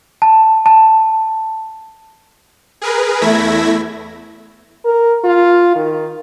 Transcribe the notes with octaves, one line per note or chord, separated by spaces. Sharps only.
A5
A5
G#4 A#4 B4
E2 A3 E4 G#6 A#6 B6
A#4
F4
D#3